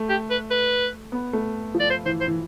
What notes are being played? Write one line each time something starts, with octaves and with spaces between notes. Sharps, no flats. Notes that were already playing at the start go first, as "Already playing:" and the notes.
Already playing: A3
G4
B4
B4
B3
A3
F3
D5
C5
E3 C5
C5
E3